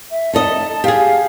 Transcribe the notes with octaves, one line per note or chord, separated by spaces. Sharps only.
E5
D#4 A4 D#5 A5
G4 G#4 F5